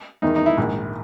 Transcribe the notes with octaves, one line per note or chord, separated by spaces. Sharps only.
E2 D#3 D#4
D#4
E4
A#1 G#2 D#3